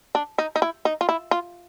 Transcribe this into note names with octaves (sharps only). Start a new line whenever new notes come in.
D4
D#4
D#4
E4
D#4
F4
E4
F4